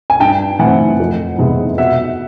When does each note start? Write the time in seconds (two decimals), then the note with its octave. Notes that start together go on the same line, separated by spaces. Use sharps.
0.10 G#5
0.20 G2 G5 A5
0.59 E3 A3 C4 F#5 G#5
1.00 F2
1.38 C3 E3 G#3 B3
1.78 B2 E5 F#5